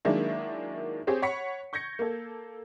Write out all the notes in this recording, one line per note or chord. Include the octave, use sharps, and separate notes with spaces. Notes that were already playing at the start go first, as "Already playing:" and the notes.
D#3 F#3 G#3 A#3 D4 E4
C4 G4 G#4 C#5
C#5 F#5 B5 C#6 B6 C#7
C#6 G6 G#6 A#6 C#7
A#3 A4